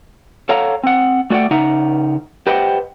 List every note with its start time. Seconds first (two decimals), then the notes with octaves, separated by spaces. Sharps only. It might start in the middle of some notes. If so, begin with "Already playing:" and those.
0.49 A4 C#5 F5 F#5 A#5
0.83 C4 F#5
1.30 A3 F#4 D5 D#5 F#5 G5
1.51 C#3 D#4 E5 F#5 A#5
2.47 G4 B4 C5 D#5 F#5 G5